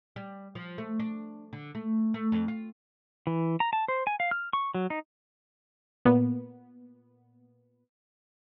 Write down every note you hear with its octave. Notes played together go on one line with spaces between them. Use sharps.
G3
F3
A3
D4
D3
A3
A3
F2
F4
E3
A#5
A5
C5
G#5
F5
F6
C#6
F#3
D#4
A#2 B3